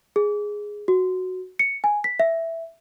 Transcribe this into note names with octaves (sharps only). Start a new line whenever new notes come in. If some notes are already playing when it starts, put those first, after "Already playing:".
G#4
F#4
C#7
G#5
B6
E5